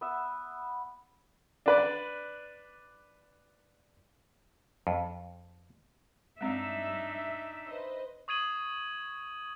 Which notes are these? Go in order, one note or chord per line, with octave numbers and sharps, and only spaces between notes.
B3 E5
D4 B4 D5
F2
G2 G#3 C4 D4 D#4 E5
B4 C5 D#5
C#6 D#6 G#6 D#7 F#7